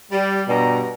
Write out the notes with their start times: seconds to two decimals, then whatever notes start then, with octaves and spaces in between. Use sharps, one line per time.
0.11 G3
0.48 G2 B2 G3 A#5